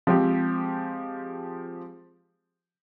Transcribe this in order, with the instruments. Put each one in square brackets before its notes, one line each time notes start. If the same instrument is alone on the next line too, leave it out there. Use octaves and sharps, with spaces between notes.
[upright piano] F3 G#3 C4 G4